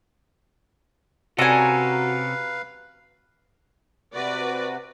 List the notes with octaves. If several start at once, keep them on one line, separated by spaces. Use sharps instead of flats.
C3 C#4 F#4 A4 B4 F5 G#5 A#5
C3 F#4 B4 D5